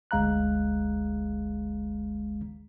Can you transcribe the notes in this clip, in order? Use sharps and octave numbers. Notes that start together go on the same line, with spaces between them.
G1 D2 G#3 F5 A#5 F#6